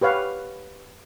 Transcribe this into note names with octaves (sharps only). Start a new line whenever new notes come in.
G4 B4 C#5 F5 F#5